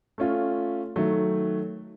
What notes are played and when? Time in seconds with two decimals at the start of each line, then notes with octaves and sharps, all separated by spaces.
0.18 A3 C#4 F4
0.96 D#3 F#3 A3